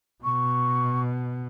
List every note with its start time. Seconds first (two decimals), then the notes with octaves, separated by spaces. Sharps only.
0.24 B2 C#6